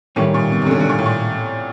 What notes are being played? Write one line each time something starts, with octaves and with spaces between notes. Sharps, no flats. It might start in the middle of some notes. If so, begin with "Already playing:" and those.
A2 D#3 G3 A#3 C#4
A#2
B2
C3
D3
C#3
D3
A#2
A2
A#2